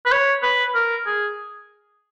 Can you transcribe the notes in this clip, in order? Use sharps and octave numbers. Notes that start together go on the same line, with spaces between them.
B4
C#5
B4
A#4
G#4